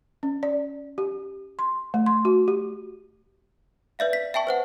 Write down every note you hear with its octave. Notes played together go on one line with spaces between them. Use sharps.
C#4
D5
G4
C6
A3
C6
F#4
G4
B4 D5 E5 F5
B6
E5 G5 A5 C#6
B4 C5 F#5